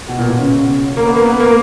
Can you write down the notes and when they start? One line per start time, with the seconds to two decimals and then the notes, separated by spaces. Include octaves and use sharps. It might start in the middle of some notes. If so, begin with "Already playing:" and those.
0.08 B2
0.18 A#2
0.28 B2
0.38 C#3
0.97 A#3
1.06 B3
1.16 A#3
1.26 B3
1.40 A#3